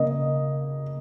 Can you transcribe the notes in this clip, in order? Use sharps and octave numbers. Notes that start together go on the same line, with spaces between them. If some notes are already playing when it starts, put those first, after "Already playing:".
Already playing: C#3 A#3 D#5